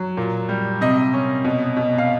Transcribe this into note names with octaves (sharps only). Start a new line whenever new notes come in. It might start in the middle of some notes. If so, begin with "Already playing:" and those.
Already playing: F#3
A#2
G3
C3 D#5
C#4
B2
B2
F5